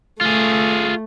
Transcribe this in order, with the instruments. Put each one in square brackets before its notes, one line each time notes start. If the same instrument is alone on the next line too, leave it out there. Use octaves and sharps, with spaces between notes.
[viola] A3 [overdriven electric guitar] F4 G#4